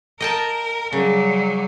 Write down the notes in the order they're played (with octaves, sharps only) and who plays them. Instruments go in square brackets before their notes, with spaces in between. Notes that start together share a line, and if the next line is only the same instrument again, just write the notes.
[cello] A#4 [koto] D#5 G5 A5
[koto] C#3 [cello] F#3 G3